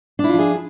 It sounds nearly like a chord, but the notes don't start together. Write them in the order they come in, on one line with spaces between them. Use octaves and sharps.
D4 E4 F4 F3 G#4